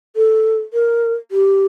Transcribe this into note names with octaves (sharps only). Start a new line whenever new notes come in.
A4
A#4
G4